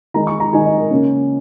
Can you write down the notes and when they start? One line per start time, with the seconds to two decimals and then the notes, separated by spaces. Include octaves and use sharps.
0.14 D#3 G#3 D#4 A#5
0.27 C#6
0.40 A#5
0.52 D#3 G#3 D#4 G#5
0.66 D#5
0.78 A#4
0.91 C#3 A#3 C#4